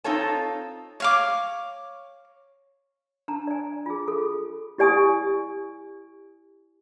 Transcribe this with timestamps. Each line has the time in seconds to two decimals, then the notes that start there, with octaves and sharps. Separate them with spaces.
0.04 C4 D#4 F4 A4 C#5 A5
1.00 C#5 F5 D6
3.28 D4 A5 A#5
3.47 D5 G#5
3.86 F4 G#4
4.08 F#4 G#4 A4
4.78 E4 G4 D5 G#5 C#6 D#6